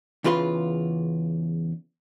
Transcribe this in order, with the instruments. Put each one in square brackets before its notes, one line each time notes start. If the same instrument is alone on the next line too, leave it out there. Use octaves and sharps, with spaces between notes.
[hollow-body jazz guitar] E2 C#3 F4 B4 C6